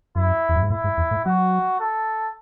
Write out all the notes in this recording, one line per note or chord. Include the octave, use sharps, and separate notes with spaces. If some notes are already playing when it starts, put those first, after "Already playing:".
F#2 E4
E2
F#2
G#2
A2 E4
G#2
E2
A2
F#3 F#4
A4